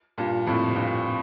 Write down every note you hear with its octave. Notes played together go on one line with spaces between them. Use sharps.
G2 A#2
F2 A2
C3
G2 A#2